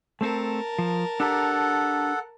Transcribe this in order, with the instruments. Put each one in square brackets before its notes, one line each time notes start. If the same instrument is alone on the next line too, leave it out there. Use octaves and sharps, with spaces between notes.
[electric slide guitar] A3 C4 A4 [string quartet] A#4 A5
[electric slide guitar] F3
[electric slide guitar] D4 G4 A#5 [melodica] A4 F#5